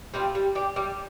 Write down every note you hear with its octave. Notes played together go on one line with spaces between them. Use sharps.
G3 C4 F4
G3
D4 G4
G3